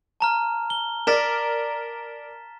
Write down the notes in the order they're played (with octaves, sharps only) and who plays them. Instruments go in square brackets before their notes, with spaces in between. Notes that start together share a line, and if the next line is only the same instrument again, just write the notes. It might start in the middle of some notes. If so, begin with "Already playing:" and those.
[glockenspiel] A5 A#5 F6
G7
[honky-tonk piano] A#4 D5 [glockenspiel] A6 B6 E7